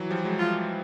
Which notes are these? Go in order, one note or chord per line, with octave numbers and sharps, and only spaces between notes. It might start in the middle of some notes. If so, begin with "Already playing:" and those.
Already playing: E3 F#3
F3 G3
F#3 G#3
F4